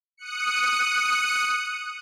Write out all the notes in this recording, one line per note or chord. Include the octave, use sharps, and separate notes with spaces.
D#6 F#6 C#7